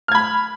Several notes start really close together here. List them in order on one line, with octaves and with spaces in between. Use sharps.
F6 G#6 B5